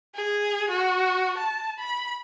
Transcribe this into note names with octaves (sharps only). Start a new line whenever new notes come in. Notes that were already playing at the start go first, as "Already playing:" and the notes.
G#4
F#4
A5
B5